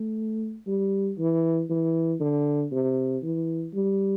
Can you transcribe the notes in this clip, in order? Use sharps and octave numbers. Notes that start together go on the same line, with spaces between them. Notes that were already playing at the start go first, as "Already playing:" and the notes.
Already playing: A3
G3
E3
E3
D3
C3
E3
G3